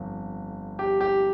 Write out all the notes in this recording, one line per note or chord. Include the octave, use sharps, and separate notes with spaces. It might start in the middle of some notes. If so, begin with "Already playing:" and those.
Already playing: G1 F2
G4
G4